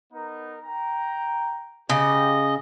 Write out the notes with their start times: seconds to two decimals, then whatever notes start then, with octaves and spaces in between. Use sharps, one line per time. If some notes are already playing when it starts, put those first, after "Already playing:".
0.13 B3 D#4 A#4
0.62 G5 A#5
1.90 C#3 G4 D#5